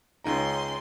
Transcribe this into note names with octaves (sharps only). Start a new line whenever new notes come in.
C#2 C#4 D#4 A#5 C6